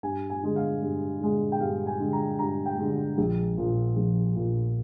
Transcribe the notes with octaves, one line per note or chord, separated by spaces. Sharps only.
G2 G#5
G#5
D3 G#3
F5
G2
D3 G#3
G5
G2 F5
G#5
D3 G#3
A#5
G2 A#5
G5
D3 G#3
A#1
A#2 F3
A#1
A#2 F3